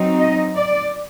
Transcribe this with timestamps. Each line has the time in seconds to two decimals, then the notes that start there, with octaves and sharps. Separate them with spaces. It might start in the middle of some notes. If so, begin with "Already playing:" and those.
Already playing: F#3 C4 D#4
0.19 D#5
0.56 D5